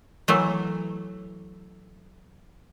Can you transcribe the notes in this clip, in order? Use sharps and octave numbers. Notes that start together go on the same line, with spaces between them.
E3 F#3 A3